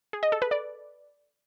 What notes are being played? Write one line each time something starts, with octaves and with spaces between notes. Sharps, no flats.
G#4
D#5
A4
B4
D5